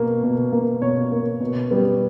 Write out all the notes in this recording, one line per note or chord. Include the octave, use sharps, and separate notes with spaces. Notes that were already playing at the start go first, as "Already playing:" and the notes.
Already playing: B2 A#3
B2
A#3
B2 C#5
A#3
B2
G3 B3